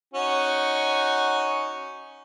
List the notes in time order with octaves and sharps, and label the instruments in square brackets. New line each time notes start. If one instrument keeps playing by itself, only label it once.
[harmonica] C#4 D#4 F#4